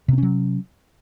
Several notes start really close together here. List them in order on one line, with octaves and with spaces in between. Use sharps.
C3 C4 C#4 F#3